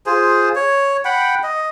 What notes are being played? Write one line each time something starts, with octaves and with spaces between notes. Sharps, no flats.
F4 G#4 C5
C#5
F#5 G5 B5
D#5